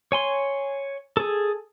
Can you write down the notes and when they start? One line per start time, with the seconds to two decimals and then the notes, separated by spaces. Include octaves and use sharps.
0.12 C#5 G#5 C6
1.17 G#4 A4